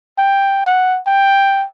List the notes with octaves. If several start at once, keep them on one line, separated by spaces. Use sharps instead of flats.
G5
F#5
G5